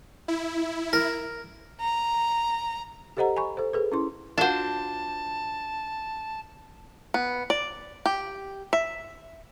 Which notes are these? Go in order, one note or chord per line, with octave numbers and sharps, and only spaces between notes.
E4
A#4
A#5
G4 A4 C5 D#5 F#5 A#5
G#5 B5 C#6
A4 C5
G#4 A4 B4
C#4 E4 C6
D4 F4 F#4 C5 A5
B3
D5
G4
E5